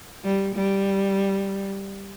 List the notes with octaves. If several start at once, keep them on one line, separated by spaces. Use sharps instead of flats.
G3
G3